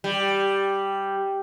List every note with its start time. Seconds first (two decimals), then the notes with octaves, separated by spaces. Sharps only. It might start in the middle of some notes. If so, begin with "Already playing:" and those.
0.04 G3